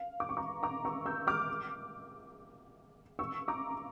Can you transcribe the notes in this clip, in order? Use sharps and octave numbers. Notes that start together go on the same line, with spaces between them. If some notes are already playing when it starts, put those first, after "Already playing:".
Already playing: F5
D6
C#6
A#5 D6
A#5 D6
C#6 E6
E6 G6
D6 F6
C#6 E6
A#5 D6